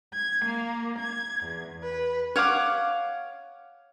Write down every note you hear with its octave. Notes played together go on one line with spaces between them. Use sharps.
G#6
A#3
G#6
E2
B4
C#5 F5 F#5 D6